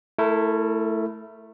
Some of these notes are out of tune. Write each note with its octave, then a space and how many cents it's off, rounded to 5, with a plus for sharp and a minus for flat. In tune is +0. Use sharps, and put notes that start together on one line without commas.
A3 +0 E4 +0 A#4 -30